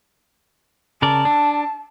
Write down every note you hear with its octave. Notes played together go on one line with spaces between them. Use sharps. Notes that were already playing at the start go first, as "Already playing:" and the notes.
C#3 A#4 D5 A5
D4